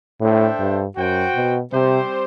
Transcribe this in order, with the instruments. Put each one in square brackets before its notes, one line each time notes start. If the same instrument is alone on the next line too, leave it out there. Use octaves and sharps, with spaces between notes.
[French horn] A2 [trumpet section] D4 A4 C5 E5 G5
[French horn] G2
[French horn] F#2 [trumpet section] F#4 C5 G5
[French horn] B2
[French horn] C3 [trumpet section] G3 C4 G4 C5